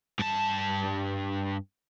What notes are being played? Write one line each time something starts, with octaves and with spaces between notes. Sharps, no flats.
G2 A5